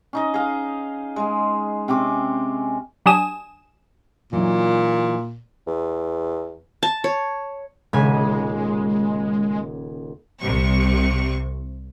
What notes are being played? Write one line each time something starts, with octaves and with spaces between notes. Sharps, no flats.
C#4 D#4 D#5
G#4 F5
G#3 G#5
C3 C4 C#4 D6
F#3 D4 G4 G#5 D#6 E7
A#2 E3 F#3 D#4
E2
A5
C#5
D#1 C#3 G#3 G#5
C2 C3 C#6